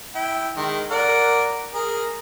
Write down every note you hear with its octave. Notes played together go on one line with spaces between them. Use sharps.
E4 G5
D#3 G#3
A#4 D5 F#5
G#4 A#4